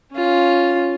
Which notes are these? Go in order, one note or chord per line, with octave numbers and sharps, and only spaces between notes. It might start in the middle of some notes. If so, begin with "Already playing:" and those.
C#4 F4